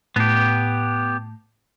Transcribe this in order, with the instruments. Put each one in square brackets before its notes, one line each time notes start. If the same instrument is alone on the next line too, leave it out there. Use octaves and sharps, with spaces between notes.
[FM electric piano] A2 [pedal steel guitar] B3 G4